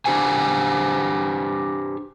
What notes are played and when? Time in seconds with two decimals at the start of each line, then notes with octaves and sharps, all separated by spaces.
0.05 D4 G4 C5 G#5